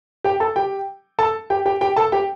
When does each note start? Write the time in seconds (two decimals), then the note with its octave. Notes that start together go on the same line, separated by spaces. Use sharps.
0.24 G4 G5
0.40 A4 A5
0.56 G4 G5
1.19 A4 A5
1.50 G4 G5
1.66 G4 G5
1.81 G4 G5
1.96 A4 A5
2.12 G4 G5